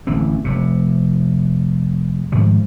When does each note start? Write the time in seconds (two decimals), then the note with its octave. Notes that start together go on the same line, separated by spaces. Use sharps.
0.07 A1 D3 E3 C4
0.44 F1 F2 C3
2.32 G#2 D#3 F3 G3